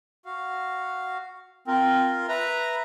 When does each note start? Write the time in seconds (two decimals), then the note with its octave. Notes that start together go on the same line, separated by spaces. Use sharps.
0.25 F#4 F5
1.67 C4 F4 A#4
2.28 B4 E5 A#5